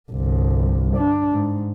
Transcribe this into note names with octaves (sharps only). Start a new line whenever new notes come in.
G1 C2
D4
G#2